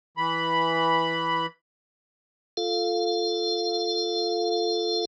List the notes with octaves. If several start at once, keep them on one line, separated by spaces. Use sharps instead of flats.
E3 B5
F4 A4 F5